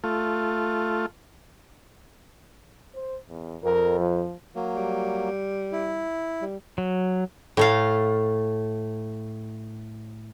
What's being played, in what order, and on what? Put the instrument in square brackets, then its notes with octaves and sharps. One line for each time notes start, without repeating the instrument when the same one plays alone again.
[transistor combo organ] A3 F4
[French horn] C5
E2
[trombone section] F2 [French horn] A#4
[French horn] F3
[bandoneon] F#3 A#3
[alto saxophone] G3
[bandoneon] E4
[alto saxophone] G3
[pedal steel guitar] F#3
[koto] A2 A3 F5